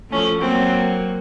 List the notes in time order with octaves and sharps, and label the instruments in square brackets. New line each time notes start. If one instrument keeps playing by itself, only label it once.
[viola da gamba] F3 A3 [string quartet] C#4
[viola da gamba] F#3 A#3 [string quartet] C4